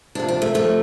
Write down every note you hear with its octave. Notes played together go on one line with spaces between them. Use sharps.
D2 C3 F3 D4
D4
A3
C3 F3 A3